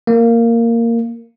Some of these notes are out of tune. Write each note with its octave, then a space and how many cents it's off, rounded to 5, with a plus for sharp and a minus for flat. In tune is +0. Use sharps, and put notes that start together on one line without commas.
A#3 -10